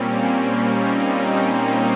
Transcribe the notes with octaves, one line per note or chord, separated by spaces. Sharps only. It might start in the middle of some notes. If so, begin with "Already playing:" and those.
Already playing: A#2 G3 A#3 C4 C#4
C#4
D#4
C4
C4